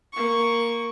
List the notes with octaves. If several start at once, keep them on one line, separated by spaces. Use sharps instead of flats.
A#3 C#6